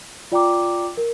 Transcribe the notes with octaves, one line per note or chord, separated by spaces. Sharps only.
F4 D5 G5 A#5 D6
A#4